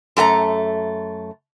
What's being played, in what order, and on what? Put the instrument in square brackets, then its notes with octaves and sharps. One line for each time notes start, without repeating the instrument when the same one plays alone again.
[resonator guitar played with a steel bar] F#2 A3 G#5 A#5